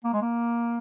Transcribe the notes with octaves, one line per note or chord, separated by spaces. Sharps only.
A#3
G#3
A#3